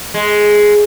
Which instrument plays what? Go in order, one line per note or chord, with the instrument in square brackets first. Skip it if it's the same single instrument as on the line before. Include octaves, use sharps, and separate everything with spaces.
[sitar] G#3